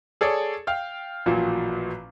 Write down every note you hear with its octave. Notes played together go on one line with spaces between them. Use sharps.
G#4 A4 C#5 D5
F5 G5 F6
A1 A#2 F3 F#3